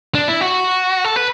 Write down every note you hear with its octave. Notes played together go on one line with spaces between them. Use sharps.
D4
E4
F#4
A4
B4